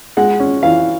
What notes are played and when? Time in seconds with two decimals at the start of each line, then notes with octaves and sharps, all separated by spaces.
0.17 G#3 F#5
0.40 C#4
0.63 E3 F5